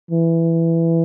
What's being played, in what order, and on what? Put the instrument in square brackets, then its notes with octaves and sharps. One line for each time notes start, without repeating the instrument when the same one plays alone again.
[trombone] E3